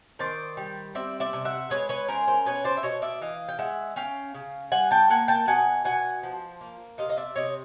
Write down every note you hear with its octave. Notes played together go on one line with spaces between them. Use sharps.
D#3 C5 D5
G3
C4 D5 E5
D5 E5
C3
E5 F#5
G#3 B4 C#5
B4 C#5
C#4 A#4 C5
A#4 C5
B2 B4 C#5
C5 D5
E5
B2 C#5 D#5
D5 E5
E3 D#5 F5
G5
G#3 E5 F#5
C#4 F5 G5
C#3
G3 F#5 G#5
G5 A5
A#3 F#5 G#5
G5 A5
B2 F#5 G#5
B2 F#5 G#5
F3
A#3
C3 D#5 F5
D#5
D5 E5
C3 C#5 D#5